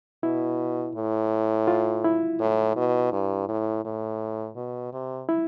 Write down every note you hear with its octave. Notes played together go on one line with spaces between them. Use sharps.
B2 E4
A2
F4
E4
A2
B2
G2
A2
A2
B2
C3
E4